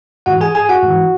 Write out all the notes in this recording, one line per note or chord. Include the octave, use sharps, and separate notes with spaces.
G#2 E3 F#4 F#5
G#4 G#5
G#4 G#5
F#4 F#5
G#2 E3